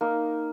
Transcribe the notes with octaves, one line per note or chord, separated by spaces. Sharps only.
A#3 D#4